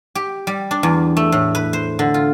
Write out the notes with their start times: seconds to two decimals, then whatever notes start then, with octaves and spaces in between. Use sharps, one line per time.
0.15 G4
0.47 G3
0.71 D4
0.83 E2
1.17 A3
1.32 A2
1.55 B4
1.73 C5
1.99 D3
2.14 F4